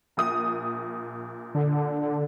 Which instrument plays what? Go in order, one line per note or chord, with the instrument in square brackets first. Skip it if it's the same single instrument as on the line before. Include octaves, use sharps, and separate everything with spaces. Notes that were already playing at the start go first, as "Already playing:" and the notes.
[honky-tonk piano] A#1 A#2 D#6
[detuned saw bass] D3